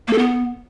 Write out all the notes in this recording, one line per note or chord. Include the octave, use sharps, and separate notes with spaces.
A#3
A4
B3